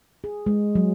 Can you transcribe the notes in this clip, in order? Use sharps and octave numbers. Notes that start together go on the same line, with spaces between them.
G#4
G#3
F#3